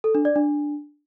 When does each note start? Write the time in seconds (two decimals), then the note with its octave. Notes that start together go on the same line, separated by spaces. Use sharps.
0.04 A4
0.15 D4
0.25 D5
0.36 D4